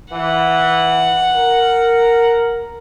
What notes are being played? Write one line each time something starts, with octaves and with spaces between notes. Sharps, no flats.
E3 F#5
A#4